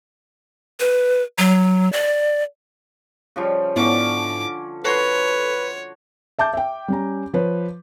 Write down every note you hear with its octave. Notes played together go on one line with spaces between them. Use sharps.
B4
F#3
D5
C#3 F3 G3
G#2 D3 B3 C#4 E4 D5 D6
F#4 A4 B4 C#5 C6
E5 A5 D6 G6
E5 G5
G3 C#4 A#5
F3 B4 C#5